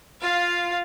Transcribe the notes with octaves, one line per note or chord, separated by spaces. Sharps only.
F4 F5